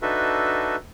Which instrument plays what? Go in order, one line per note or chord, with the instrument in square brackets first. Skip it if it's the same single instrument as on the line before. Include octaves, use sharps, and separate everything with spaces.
[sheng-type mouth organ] D4 D#4 F#4 A4 B4 E5